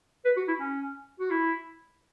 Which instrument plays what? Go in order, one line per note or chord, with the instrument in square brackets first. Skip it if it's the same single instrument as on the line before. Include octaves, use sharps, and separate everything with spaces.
[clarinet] B4
F#4
E4
C#4
F#4
E4